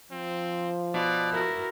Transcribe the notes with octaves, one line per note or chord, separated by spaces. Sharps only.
F3 C4
B2 D5
E4 F#4 A#4